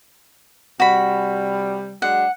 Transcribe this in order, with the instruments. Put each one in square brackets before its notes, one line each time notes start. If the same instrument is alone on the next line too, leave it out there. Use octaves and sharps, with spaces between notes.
[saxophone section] C3 G3 [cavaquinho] F#4 B5
[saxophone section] F#3 G#3 D4 [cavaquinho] F#5